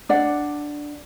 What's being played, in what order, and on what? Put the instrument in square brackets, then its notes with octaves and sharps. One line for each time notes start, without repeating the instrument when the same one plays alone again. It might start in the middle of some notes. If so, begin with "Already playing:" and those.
[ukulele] D4 D5 F#5